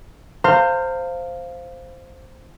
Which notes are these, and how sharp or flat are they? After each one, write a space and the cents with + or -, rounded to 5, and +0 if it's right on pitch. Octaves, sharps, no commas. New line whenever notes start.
C5 +0 F5 +0 A#5 -40